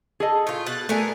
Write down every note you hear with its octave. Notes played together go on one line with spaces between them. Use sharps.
G#4 A4 D#5
A2 F4
B2 F#6 A6
A3 B3 D4 A#4 G#5